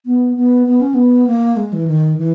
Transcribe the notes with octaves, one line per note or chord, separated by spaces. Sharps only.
B3
B3
B3
C#4
B3
A#3
G#3
E3
D#3
E3